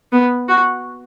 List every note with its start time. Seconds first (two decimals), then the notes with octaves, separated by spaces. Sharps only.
0.12 B3
0.48 F#4